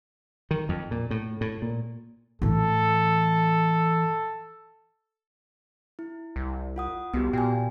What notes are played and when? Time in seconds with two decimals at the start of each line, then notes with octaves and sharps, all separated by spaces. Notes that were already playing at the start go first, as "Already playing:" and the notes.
0.51 D#3
0.69 F2
0.91 A#2
1.11 A2
1.41 A2
1.62 A#2
2.42 A2 E3 A4
5.99 E4
6.36 C2
6.76 F4 F#5 D#6
7.14 C2 B3 F#4 G4
7.33 A#2 G5 G#5